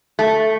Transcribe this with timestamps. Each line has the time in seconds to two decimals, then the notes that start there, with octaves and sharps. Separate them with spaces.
0.19 A3